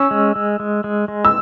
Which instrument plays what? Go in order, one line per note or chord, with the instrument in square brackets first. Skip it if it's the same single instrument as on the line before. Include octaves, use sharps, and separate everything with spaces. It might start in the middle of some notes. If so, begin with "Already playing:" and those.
Already playing: [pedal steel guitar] C#4 [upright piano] E6
[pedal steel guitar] G#3
G#3
G#3
G#3
G#3
[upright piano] E6